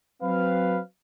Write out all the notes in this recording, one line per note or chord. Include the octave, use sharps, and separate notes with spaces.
F#3 C4 B4 F5